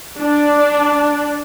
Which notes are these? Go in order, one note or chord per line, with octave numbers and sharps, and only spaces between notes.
D4